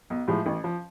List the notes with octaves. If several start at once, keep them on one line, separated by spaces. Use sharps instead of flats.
B1
A2 F3 G#3
A1
F3